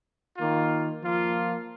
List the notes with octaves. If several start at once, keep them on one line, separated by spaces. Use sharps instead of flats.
D#3 A#3 F4
F3 A#3 F4